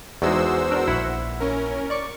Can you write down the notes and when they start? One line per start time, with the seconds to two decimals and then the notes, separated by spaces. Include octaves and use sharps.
0.22 E2 G#3 D#4 F#4 G#4 C5 D5 E6
0.71 D4 A#4
0.88 A#1 E4 F#5
1.40 C#4 A#4
1.90 D5 C#6 D6